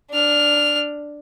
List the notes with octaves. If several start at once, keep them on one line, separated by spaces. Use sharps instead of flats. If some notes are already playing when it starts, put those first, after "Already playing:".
D4 F6